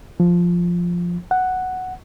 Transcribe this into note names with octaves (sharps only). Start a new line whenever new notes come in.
F3
F#5